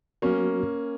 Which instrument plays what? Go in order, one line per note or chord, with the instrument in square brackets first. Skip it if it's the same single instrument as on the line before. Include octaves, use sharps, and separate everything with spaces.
[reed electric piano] F#3 B3 F#4 [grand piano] A#3 C#4